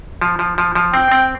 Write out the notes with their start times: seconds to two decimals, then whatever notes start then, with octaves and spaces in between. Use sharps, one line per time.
0.22 F3
0.39 F3
0.58 F3
0.75 F3
0.94 C4 G5
1.11 C4